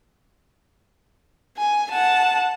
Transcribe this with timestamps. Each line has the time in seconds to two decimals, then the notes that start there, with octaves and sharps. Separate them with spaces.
1.57 G#5
1.91 F#5 A5